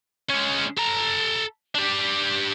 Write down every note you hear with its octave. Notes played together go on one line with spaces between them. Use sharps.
G#3 C#4
A4 A#5
D4 G4